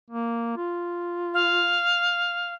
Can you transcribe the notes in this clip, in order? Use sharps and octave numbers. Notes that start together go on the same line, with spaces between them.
A#3
F4
F5